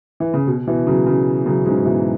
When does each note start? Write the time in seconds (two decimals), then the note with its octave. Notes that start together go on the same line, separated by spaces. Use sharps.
0.20 E3
0.34 C#3
0.47 B2
0.67 B2 E3
0.87 C#3 F#3
1.07 C#3 F#3
1.46 C#3 F#3
1.66 G#2 C#3
1.85 B2 E3